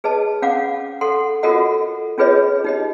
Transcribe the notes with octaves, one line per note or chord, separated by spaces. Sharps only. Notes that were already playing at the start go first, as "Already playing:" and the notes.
G#4 B4 D#5 A5
C#4 F5 F#5 D6
A4 F#5 C6
F4 F#4 A4 A#4 D#5 F#5
C#4 F4 G#4 B4 C#5 D#5
D#4 G4 D#5